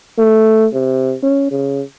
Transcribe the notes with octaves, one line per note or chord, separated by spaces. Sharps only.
A3
C3
C#4
C#3